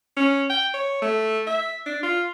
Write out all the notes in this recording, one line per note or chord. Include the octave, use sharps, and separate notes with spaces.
C#4
G5
C#5
A3
E5
D4
F4